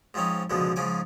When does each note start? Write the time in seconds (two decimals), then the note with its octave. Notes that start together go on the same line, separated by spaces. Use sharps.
0.14 G#2 F3 C4 C#4 D#4
0.50 C#2 B2 D3 F3 G#3
0.76 G#2 C#3 F3 G#5 D6